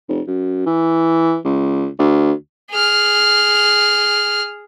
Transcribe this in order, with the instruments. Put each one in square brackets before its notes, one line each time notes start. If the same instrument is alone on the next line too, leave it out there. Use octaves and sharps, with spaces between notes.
[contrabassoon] F1
F#2
E3
C#2
D2
[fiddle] G#4 F6